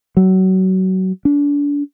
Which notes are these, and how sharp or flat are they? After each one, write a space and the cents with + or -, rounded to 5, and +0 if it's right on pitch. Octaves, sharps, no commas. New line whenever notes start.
F#3 +25
D4 -30